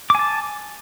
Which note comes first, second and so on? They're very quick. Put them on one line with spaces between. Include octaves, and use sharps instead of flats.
D6 G#5 A5